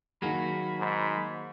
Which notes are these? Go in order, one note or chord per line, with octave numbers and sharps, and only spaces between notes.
D#3 F#3 A#3 F#4 G#4 B5
G#2